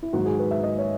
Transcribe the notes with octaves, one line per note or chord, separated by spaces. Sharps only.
E4
G#2 D#3 F#3 F#4
G#4
B4
E5
D#5
C#5